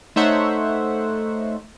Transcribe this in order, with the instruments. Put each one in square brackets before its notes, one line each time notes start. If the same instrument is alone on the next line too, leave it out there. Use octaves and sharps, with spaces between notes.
[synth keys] A3 D#4 C5 C#5 E5 F#5